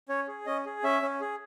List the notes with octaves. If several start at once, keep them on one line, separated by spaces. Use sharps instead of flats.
C#4 C#5
G#4
C#4 D#5
G#4
C#4 E5
C#4
G#4